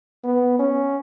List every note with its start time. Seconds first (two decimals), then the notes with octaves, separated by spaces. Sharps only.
0.24 B3
0.59 C#4